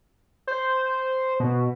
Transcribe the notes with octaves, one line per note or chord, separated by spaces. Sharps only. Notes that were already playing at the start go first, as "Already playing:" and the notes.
C5
B2